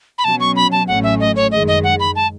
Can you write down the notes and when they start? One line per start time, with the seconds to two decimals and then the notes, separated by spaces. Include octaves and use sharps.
0.18 B5
0.24 B2 F#3 C#4 A5
0.40 C#6
0.56 B5
0.72 A5
0.88 A1 A2 F#3 A3 C#4 F#5
1.03 E5
1.20 D#5
1.36 C#5
1.52 F#2 D#3 G#3 D#5
1.68 D#5
1.84 F#5
2.00 B5
2.16 A5